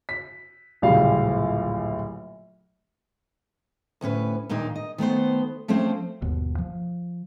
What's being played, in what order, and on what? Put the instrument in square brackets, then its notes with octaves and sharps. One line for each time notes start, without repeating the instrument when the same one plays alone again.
[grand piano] B6
D1 A#1 C#3 G3 F5
[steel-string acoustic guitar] D2 A2 C#4 B4
D#2 A#2 D#3 D4 D#4
D#5
D#3 A3 B3 C5
F3 A3 C4 C#4 C5
[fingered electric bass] G1 D#2 B2
F3